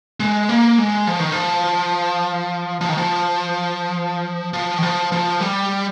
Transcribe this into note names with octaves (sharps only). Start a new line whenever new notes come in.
G#3
A#3
G#3
F3
D#3
F3
F3
D#3
F3
F3
D#3
F3
F3
G3